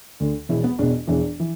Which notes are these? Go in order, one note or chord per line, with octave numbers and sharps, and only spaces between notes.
D2 D3
E1 E2 B2 E4
B3
E1 E2 B2 D4
E1 E2 E3 D4
E3